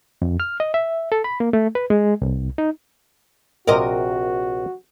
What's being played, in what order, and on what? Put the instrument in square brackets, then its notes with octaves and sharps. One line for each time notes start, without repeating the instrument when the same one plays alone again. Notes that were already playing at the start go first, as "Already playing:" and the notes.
[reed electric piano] F2
F6
D#5
E5
A4
B5
A#3
A3
B4
G#3
C2
D#4
[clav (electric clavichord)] A#1 C3 C5 [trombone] F#4 [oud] A#4 D#5